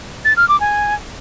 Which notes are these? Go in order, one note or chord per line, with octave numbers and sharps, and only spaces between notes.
A6
F6
D6
G#5